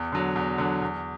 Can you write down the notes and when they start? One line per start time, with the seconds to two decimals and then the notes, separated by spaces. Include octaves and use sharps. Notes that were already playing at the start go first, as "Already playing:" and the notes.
Already playing: E2
0.12 D3 F#3
0.36 E2
0.58 D3 F#3
0.82 E2